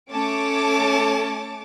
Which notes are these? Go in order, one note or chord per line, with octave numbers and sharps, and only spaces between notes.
A3 C#4 C#5 A5 D6